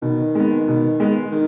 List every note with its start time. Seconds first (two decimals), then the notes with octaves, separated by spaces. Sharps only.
0.02 B2 D#3
0.35 G#3 B3
0.68 B2
1.00 G#3 B3
1.32 D#3